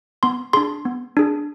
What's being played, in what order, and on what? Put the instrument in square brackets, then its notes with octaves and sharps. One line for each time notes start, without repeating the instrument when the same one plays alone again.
[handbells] B3 C6
D4 G#4 C6
B3
D4 G#4